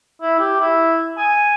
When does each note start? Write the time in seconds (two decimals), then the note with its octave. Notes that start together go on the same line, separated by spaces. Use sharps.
0.22 E4
0.39 G4
0.60 E4
1.17 G#5